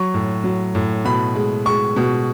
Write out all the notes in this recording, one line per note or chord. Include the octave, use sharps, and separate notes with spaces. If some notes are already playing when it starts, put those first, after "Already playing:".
Already playing: F#3 C#6
A2
F#3
A2
B2 B5
G#3
G#3 C#6
B2